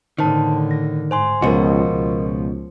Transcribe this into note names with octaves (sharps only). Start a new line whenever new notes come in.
A2 D3 D#3 C5 A5
A#6
G#2 C5 G#5 C6
C#2 B2 F3 F#4 A#4 D#5
C#2